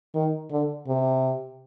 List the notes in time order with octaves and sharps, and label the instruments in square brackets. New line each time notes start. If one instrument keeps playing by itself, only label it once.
[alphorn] D#3
D3
C3